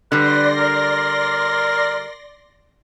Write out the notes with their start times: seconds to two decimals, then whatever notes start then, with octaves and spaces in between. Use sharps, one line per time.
0.12 D3 G3 B4 D5 C6 A#6
0.58 A#4